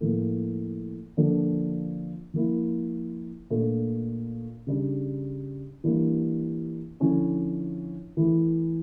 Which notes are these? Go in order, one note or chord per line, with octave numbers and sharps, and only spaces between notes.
A2 F3 A#3
D3 F3 A#3 D4
F3 A#3 E4
A#2 A3 D4
C#3 G3 D4
E3 G3 A#3 D4
D3 F3 C#4 E4
E3 A3 E4